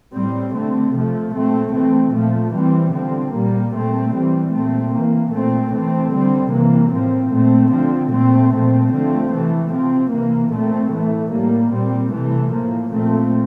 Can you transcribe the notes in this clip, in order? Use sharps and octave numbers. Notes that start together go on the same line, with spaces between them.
A2 G3 C4
D3 A3 C4
C3 F3 A3
A#2 A3 C4
E3 A3 C4
A#2 F3 A3
E3 G3 C4
D3 F3 C4
A#2 G3 A#3
A#2 A3 C4
E3 G3 C4
A#2 A3 C4
E3 A#3
A#2 A3 C4
E3 A3 C4
D3 G3 C4
C3 E3 A#3
A2 F3 C4
A#2 A3 C4
D3 F3 C4
A#2 A3 C4
A#2 F3 A3 C4
D3 F3 A3 C4
C3 E3 A3
C3 F3 C4
C3 E3 A#3
A#2 A3 C4
A2 E3 A3
A2 G3 A#3
A#2 G3 C4
C3 E3 A3
A2 F3 A#3
A#2 F3 A3 C4